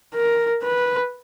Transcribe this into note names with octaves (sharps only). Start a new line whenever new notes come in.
A#4
B4